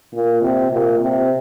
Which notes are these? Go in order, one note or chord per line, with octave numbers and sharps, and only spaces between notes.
A#2
C3
A#2
C3